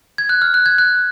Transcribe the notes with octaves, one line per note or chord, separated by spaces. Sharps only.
G#6
F#6
F6
F#6
G#6
F#6